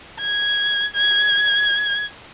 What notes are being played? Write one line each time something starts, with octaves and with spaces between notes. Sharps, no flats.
G#6
G#6